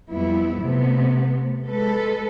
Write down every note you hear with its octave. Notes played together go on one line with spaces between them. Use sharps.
F2 G3 B3 E4
C3 A3 B3
G#3 A4 B4